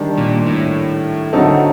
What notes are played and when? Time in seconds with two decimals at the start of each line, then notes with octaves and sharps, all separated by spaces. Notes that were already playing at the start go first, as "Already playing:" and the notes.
Already playing: D#3 G3 D4
0.18 A#2
0.46 A2
1.33 D3 F#3 C4 D#4 A4